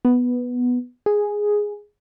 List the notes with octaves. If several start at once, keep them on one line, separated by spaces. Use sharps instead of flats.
B3
G#4